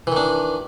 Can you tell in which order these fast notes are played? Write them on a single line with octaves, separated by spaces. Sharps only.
E3 D#3 D4